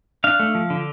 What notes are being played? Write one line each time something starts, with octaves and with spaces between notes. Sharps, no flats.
D4 F5
A3
F3
D3